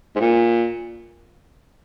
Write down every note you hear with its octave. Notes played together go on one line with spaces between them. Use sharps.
G#2
A#2